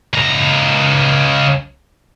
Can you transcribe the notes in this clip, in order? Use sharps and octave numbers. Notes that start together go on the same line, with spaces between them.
C#2 A#5